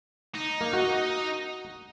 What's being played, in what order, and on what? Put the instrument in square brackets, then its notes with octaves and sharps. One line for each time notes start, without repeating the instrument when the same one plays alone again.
[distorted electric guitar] D#4
[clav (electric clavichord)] A#3
F#4